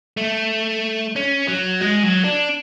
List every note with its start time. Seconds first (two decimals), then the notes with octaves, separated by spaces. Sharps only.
0.17 A3
1.16 C#4
1.48 F#3
1.81 G#3
2.03 F#3
2.24 D4